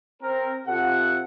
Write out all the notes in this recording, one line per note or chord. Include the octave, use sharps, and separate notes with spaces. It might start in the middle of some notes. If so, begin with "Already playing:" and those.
C4 A#4
C3 F4 A4 F#5